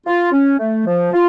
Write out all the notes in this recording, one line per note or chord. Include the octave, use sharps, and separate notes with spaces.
F4
C#4
A3
F3
F4